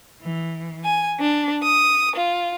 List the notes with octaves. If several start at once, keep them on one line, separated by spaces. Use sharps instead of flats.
E3
G#5
D4
D#6
F4